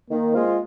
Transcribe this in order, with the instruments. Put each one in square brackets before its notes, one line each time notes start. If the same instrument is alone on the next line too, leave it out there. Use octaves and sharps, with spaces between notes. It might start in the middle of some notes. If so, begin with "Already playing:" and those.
[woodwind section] D#3 [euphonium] A#3
[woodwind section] G#3 C4 F4